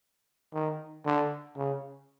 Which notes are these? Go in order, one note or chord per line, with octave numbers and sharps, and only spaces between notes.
D#3
D3
C#3